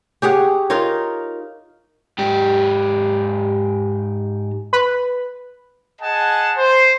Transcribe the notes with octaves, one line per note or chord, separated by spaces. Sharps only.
G4 G#4 C#5 F#5
D#4 F4 A#4 C#5
G#2 G4
B4
G#4 D#5 F#5 G#5 A5
C5